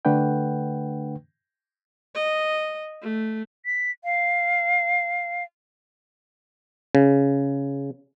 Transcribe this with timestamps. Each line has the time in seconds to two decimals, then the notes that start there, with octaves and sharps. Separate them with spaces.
0.05 D3 A3 D4 B4 F#5 G5
2.15 D#5
3.02 A3
3.66 B6
4.04 F5
6.95 C#3